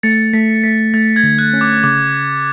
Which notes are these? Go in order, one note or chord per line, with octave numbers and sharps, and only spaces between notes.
A3 A6 C#7
A3 B6
A3 B6
A3 A6
G#6
D3
F#6
C#4
D6
C#3 D6